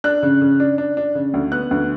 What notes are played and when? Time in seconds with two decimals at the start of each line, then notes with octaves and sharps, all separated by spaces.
0.04 D4 F#6
0.23 C#3
0.41 C#3
0.60 D4
0.78 D4
0.97 D4
1.15 C#3
1.34 D2
1.52 B3 F#6
1.71 D2